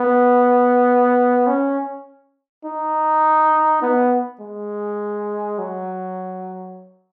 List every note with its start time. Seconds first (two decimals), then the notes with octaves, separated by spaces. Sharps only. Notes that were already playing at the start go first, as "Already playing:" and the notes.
Already playing: B3
1.47 C#4
2.65 D#4
3.82 B3
4.40 G#3
5.59 F#3